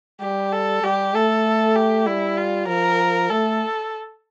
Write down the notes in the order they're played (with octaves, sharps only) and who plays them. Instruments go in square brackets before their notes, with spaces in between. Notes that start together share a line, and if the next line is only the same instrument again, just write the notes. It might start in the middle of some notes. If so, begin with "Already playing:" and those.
[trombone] G3 [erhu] G4
[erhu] A4
[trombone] G3 [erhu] G4
[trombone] A3 [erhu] A4
[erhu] G4
[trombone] G3 [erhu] E4
[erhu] F4
[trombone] F3 [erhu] A#4
[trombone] A3 [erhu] A4